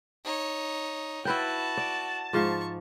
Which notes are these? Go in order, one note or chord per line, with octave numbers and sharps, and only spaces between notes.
D#4 C#5
E4 F#4 B4 G5 A5
D5
G#2 F3 F5 C#6